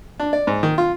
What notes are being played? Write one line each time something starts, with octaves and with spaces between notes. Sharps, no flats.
D4
D5
G#2
D#3
F4